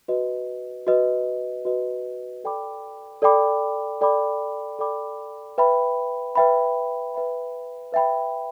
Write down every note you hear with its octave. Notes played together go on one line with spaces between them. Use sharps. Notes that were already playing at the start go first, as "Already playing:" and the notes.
F#4 B4 D#5
F#4 B4 D#5
F#4 B4 D#5
A4 D5 G5 B5 D6
A4 D5 G5 B5 D6
A4 D5 G5 B5 D6
A4 D5 G5 B5 D6
B4 E5 G5 B5
B4 E5 G5 B5
B4 E5 G5 B5
B4 E5 G5 B5